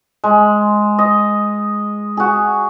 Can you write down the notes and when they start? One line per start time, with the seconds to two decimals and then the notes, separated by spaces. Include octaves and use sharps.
0.24 G#3
0.99 D#5
2.17 F#4 G#4